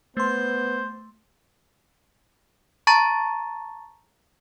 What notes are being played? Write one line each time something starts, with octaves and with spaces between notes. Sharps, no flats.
A3 B3 C5 C6
A5 A#5 C#6 A6